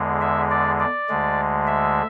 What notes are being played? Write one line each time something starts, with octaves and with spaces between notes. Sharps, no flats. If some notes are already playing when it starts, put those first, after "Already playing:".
Already playing: E2 D3 G#3
E5
D5
D5
D2 D3 G#3
E5